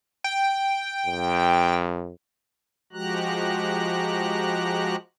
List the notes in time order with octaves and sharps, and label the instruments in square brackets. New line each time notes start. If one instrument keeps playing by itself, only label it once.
[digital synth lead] G5
[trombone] F2
[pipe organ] F3 G#3 F#4 G4 A#5 F#6